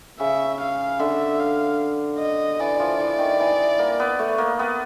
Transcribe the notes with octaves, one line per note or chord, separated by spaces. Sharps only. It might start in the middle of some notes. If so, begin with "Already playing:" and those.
C#3 E5
F5
D3 E5
F5
D#5
E3 D5
F3
E3
D#3
E3
A#3
B3
A3
A#3
B3